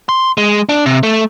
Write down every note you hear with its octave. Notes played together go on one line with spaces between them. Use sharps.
C6
G#3
D4
C3
A3